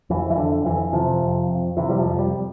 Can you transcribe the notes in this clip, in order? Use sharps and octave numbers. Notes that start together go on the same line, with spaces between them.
F2 E3
E3
F2 D3
F2 E3
C3 F3
F2
F2
C3 E3
G3
F3
F2
G3